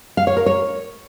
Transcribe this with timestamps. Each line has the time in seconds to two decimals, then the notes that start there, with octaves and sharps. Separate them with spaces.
0.17 F5
0.27 C#5
0.37 A#4
0.46 C#5